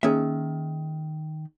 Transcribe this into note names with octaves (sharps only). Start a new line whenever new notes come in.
D#3 A#3 C#4 G#4 E5